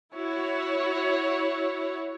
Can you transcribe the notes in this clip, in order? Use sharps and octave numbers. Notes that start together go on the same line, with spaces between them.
E4 F#4 C#5